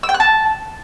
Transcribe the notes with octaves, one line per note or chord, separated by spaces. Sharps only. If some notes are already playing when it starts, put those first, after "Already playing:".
E6
G5
F#6
A5